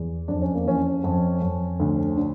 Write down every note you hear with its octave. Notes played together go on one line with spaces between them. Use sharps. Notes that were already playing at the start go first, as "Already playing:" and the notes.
Already playing: E2
F2 D4
C#4
A#3
E3 C#4
F2
F2
D2
D3